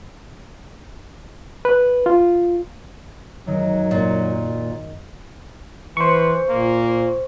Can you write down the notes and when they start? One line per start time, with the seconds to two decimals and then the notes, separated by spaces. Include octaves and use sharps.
1.65 B4
2.06 F4
3.47 F#2 D#3 F#3 G#3
3.91 A#2
5.97 E3 B4 C5 C#6
6.50 A#2 A#3